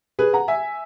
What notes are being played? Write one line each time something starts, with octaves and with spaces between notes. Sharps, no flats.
G#4 B4
F#5 A#5
E5 G#5